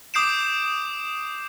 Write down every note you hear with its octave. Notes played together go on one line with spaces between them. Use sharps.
D6 D#6 G6 C7 D7 E7